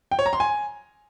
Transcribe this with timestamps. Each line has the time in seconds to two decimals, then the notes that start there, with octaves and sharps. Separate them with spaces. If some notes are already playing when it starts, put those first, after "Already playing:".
0.11 G5
0.19 C#5
0.26 A#5
0.33 C6
0.40 G#5